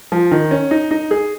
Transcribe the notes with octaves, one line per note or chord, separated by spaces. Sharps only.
F3
D#3
C#4
D#4
D#4
G#4